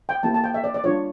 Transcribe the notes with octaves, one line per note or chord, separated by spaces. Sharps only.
G5
A#3 E4 G4 A5
A5
G5
E5
D5
D5
G3 D4 F4 C#5